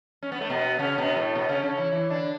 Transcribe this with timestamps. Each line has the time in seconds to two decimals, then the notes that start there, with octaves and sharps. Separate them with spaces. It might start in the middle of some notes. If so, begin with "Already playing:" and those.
0.23 C#4
0.32 B3
0.41 A3
0.50 B2 B3
0.79 C#3 C#4
0.98 B2 B3
1.16 A2 A3
1.35 B2 B3
1.49 C#3 C#4
1.63 C#3 C#4
1.77 E3 E4
1.92 E3 E4
2.10 D3 D4